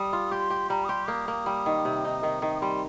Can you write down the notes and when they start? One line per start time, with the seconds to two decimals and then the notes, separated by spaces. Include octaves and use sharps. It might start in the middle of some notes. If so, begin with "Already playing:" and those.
Already playing: G3 D#6
0.13 F4
0.31 G4 C6
0.50 G4
0.70 G3 A#5
0.84 D#6
0.89 G4 C6
1.08 A#3 D#6
1.28 A#3
1.46 G3
1.66 D#3
1.85 C3
2.05 D#4
2.23 D#3
2.42 D#3
2.55 D#6
2.61 G3 C6